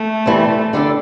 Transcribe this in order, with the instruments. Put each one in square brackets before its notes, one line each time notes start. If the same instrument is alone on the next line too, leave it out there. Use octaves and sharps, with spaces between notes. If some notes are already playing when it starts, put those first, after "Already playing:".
Already playing: [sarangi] A3
[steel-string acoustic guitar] C3 E3 G3
D3 G3 D4 A4